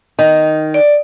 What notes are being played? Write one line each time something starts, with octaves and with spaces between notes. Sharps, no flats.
D#3
D5